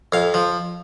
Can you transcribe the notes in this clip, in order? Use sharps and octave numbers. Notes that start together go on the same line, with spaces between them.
F2 F5
F3